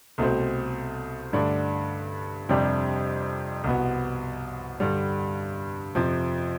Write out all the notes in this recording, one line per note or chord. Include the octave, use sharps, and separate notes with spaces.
C2 B2 A3 C4
G2 D3 A3 D4
F2 C3 G3 D4 G4
C2 B2 B3
G2 D3 G3
F2 C3 F3